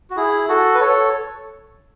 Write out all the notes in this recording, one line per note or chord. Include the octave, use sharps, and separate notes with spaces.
F#4
E4 G#4
F#4 A4
B4
A4 C#5